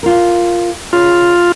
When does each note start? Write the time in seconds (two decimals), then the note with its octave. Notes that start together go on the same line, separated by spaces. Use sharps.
0.03 F4 A#4
0.93 C#3 F4